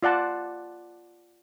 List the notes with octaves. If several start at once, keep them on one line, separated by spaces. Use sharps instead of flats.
F4 D5 F#5 A5